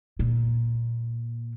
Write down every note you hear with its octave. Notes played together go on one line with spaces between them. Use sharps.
A#2